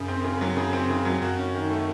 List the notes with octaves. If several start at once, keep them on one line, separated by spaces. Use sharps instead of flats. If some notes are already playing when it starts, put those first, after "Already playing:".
Already playing: F#2 C#3
C4
C#3
F#3
C#3
C4
C#3
F#3
F#2 F#4
C#4
D#3
A3